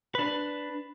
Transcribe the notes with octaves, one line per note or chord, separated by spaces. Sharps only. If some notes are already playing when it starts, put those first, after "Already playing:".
D4 B4